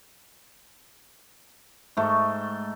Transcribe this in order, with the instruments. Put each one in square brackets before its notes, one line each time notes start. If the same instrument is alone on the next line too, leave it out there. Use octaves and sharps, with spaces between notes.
[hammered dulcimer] G#2 A3